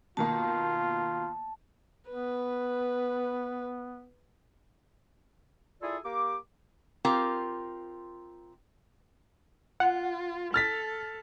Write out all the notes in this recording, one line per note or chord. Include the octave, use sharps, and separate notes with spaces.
B2 D#3 A#3 F4 A5
B3 B4
E4 F4 G#4 A4 D5
A#3 G4 D6
C4 F4 G4 A#4
F4 F#5
A4 F6 A6 B6